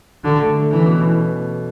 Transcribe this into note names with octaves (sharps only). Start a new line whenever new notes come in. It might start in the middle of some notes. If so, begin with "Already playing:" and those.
D3 F#4
A3
A3
E3 C#4
B2